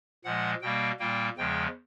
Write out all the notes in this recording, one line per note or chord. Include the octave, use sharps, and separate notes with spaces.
A#2 F3 G#3 F#5
B2 G3 A#3 G5
A#2 G3 A#3 G5
E2 C#3 F3 G#3 G5